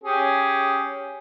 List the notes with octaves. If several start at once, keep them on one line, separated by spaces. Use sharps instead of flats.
C#4 G4 G#4